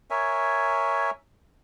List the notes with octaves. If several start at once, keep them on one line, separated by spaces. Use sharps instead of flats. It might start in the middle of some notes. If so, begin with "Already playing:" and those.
A#4 C#5 E5 G#5